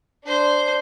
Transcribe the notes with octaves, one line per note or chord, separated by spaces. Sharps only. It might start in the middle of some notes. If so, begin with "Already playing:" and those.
D4 C5